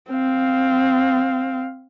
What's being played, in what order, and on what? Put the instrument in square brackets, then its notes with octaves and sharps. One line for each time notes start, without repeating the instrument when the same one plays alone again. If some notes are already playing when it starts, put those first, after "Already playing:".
[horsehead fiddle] C4 F5